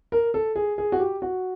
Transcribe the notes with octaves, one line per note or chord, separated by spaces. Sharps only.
A#4
A4
G#4
G#4
F#4
G4
F#4